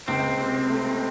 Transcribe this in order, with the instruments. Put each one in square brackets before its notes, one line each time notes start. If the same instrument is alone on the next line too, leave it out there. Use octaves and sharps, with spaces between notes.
[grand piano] C#2 [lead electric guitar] C4
[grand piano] C3
A3